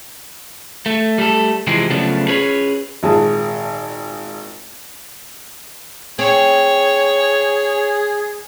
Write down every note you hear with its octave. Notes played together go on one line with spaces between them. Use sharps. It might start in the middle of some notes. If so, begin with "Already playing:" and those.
A3
G3 A3 A4
C3 E3 F3 G#3 C4
C#3 F3 F#3 A3 B3 D4
C#4 G#4 B4 C#5
G#1 A#2 G#4 A5
C4 G#4 C#5